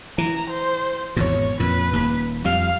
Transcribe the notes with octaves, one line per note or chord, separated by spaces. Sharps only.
E3 A#5
C5
G#1 E2 B2 C#5
F2 A#2 B4
D#1 D#2
F2 G3 F5